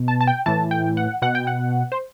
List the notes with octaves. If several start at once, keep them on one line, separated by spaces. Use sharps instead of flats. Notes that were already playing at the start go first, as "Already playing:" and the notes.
Already playing: B2
A5
A5
G5
A2 E3 A5
G5
F#5
B2 F#5
G5
F#5
C5